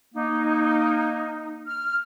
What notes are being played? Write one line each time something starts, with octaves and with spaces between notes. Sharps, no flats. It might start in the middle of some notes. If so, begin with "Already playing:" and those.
A#3 D#4
F6